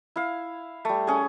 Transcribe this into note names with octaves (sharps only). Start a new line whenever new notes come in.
E4 F5
G3 A3
C#4 G#4